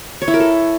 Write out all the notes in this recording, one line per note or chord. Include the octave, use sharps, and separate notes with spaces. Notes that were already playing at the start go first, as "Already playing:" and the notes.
C#5
E4
A#4
A4